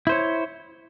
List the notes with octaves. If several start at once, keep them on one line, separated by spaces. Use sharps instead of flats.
E4 C5 C#5